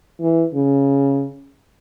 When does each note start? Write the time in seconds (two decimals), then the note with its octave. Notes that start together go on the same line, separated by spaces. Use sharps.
0.21 E3
0.54 C#3